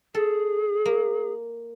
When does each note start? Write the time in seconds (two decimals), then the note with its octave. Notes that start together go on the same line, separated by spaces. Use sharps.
0.15 G#4 A4
0.85 A#3